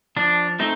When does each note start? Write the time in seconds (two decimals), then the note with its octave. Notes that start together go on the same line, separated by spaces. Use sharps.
0.16 F3 D4
0.59 A3 C4 D#4